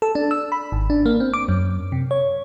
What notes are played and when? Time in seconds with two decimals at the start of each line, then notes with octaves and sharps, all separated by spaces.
0.02 A4
0.15 D4
0.31 E6
0.52 B5
0.72 G#1
0.90 D4
1.06 A#3
1.20 C4
1.34 D6
1.48 F#2
1.92 C3
2.11 C#5